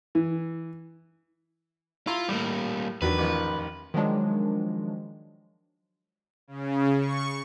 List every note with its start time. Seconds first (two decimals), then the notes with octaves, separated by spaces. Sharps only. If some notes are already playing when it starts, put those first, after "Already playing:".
0.15 E3
2.07 E4 F4 A#5 C6
2.28 A2 G3 A#3
3.02 E2 D#3 F#3 D4 B4
3.18 A1 D#3 F3
3.94 D#3 F3 F#3 G#3 D4
6.48 C#3
6.99 C#6